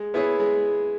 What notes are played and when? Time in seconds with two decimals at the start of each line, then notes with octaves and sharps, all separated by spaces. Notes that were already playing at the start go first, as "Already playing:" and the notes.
Already playing: G#3
0.14 B3 E4 G#4 C#5
0.40 G#3